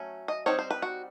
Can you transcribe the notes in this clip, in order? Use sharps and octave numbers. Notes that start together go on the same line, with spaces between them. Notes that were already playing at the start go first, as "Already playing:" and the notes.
Already playing: F#3 A3 C#4
D#5
G3 C4 D#4 C#5
C5
B4
F#4